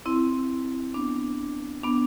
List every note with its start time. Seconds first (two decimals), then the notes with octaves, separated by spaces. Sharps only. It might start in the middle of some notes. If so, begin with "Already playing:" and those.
0.06 C4 E4
0.94 B3 D4
1.84 B3 D4